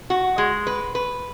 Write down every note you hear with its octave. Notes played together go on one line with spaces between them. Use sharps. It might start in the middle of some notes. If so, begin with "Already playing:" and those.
F#4
G#3
B4
B4